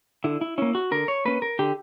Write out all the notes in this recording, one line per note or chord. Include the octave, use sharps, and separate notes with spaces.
D3 E4
E4
A#3 C#4 E4
F#4
D3 A#4
C#5
A#3 C#4 B4
A#4
D3 G4